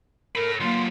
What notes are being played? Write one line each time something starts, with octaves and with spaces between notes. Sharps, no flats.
A4 A#4 B5
F#3 A#3 F4 C6